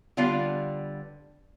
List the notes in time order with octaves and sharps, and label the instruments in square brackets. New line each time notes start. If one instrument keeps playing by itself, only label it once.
[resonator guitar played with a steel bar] D3 G3 B3 F4 F5